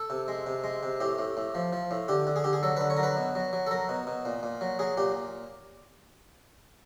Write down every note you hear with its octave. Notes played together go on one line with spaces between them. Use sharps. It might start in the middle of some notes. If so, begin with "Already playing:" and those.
Already playing: A4
C3
G#3
C3
G#3
C3
A2 G4
A2
A2
F3
F3
A2
D3 G4
D3
G#4
D3 G4
G#4
F#3 A4
D3 B4
C#5
A#4
F#3 B4
B2
F#3
F#3
A4
F#3 A#4
B2
B2
A#2
A#2
F#3
F#3 G#4
A#2 G4